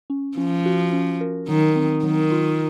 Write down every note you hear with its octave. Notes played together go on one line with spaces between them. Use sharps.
C#4
F3 C#4
F#4
C#4
A#4
D#3 F#3
C4
D#3 F#3
F4